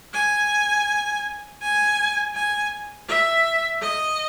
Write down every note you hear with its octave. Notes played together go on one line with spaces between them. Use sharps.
G#5
G#5
G#5
E5
D#5